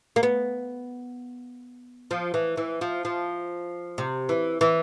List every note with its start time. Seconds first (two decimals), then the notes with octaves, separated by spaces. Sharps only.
0.16 A#3
0.23 B3
2.11 F3
2.34 E3
2.57 E3
2.81 F3
3.05 F3
3.98 C3
4.29 E3
4.61 E3